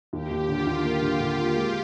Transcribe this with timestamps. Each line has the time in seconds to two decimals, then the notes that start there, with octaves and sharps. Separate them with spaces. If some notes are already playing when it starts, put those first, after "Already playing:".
0.13 D#2 G4
0.31 D#2
0.48 D3 F4
0.67 D#2
0.84 A#3 G4
1.02 D3
1.20 D3
1.38 A#3
1.56 G#3